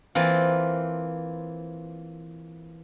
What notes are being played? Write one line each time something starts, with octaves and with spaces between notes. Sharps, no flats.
E3 A#3 C4 F4